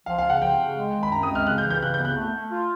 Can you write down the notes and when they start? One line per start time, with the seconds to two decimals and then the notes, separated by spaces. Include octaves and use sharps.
0.06 F3 F5
0.18 F5
0.24 C#3
0.30 F#5
0.42 F3 G5
0.59 C#3
0.77 G#3
0.95 D#3
1.03 B5
1.11 F#2 A#5
1.23 D#6
1.30 G#3
1.35 F6
1.47 C#3 F#6
1.58 G6
1.64 E3
1.70 G6
1.82 C#3 F#6
1.94 G6
2.00 B3
2.05 F#6
2.17 A3
2.35 A3
2.52 F4